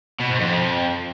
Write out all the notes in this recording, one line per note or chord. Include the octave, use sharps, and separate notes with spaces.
B2
G#2
F2